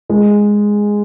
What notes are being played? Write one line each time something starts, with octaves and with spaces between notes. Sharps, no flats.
G#3